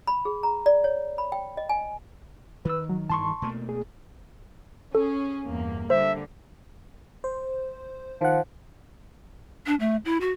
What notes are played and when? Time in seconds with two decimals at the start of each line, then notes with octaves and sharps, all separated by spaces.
0.07 B5
0.25 G#4
0.43 A#5
0.66 D5
0.84 C#5
1.18 B5
1.32 G5
1.57 D#5
1.69 G#5
2.65 D#3 B4 E6
2.89 F#3
3.10 G2 D#3 E3 A5 C6 C#6
3.42 B2 A3 A#3
3.69 G#4
4.95 C#4 G#4 A4
5.46 E2 G2 A#3
5.90 D3 G3 A#3 C5 E5
7.24 C5
8.21 D#3 F3 F#5
9.66 D4
9.80 A3
10.05 E4
10.21 F#4